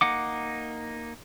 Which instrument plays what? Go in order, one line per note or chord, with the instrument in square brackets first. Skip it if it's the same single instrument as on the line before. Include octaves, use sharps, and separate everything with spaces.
[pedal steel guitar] A#3 D#4 F#5 D6